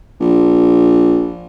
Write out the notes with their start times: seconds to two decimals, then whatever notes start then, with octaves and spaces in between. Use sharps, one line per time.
0.21 A#1